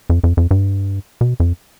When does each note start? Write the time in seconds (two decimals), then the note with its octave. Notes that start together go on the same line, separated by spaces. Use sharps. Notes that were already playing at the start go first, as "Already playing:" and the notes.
0.10 F2
0.24 F2
0.37 F2
0.51 G2
1.21 B2
1.40 F2